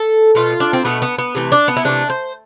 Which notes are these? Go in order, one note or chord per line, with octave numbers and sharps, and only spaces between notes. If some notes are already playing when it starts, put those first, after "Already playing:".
Already playing: A4
B2 A3 F4
D4
C4
B2 A3 B3
B3
B3
C3 E3 A3
D4
B3
E4
C3 E3 A3 D4
C5